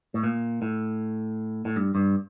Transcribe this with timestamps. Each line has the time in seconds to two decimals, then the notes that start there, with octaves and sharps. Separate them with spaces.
0.14 A2
0.24 A#2
0.62 A2
1.65 A2
1.76 G2
1.95 G2